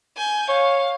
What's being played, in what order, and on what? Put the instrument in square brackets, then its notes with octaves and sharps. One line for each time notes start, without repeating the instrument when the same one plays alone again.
[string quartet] G#5 G6
[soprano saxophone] C#5 [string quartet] F5